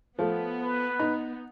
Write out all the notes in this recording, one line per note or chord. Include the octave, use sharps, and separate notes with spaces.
F3 A3 B3
B4
D#4